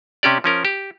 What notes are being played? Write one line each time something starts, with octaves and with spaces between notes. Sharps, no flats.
C3 C#4 G4 D5
F3 C#4 A#4
G4